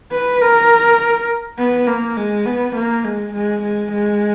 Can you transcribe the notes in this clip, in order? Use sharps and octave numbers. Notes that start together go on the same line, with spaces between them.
B4
A#4
B3
A#3
G#3
B3
A#3
G#3
G#3
G#3
G#3